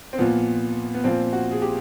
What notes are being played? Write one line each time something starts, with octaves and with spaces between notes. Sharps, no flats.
C4
A#2 F3 B3
B3
A#2 F3 C4
F#4
G#4
G4